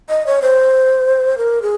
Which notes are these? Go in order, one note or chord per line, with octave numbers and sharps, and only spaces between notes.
D#5
C#5
C5
A#4
G#4